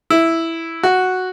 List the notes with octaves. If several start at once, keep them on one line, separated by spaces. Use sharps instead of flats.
E4
F#4